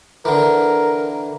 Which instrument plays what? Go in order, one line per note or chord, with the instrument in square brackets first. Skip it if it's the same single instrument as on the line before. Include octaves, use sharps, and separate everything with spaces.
[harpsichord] D3 E3 [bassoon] A#4